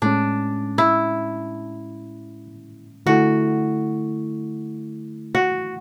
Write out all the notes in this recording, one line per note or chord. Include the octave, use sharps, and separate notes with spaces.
A2 G#3 C#4 D4
E4
D3 A3 E4 F#4 A4
F#4